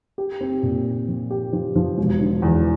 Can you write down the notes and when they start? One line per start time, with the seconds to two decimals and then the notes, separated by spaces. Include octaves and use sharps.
0.18 G4
0.41 C4
0.63 A#2
0.85 C4
1.08 F3
1.30 G4
1.53 F3
1.76 F3
1.98 E1
2.20 D3
2.42 E2